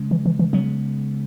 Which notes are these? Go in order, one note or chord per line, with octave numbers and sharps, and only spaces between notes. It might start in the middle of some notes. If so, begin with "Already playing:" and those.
Already playing: C#3 G#3 C#4
E3
E3
E3
C#3 F#3 G#3 B3